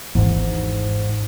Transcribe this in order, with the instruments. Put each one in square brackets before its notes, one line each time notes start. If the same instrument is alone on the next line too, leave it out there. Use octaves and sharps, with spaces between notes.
[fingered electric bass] G#1 E2 [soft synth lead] G#2